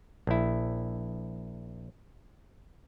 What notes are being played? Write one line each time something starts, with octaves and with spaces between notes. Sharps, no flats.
A#1 E4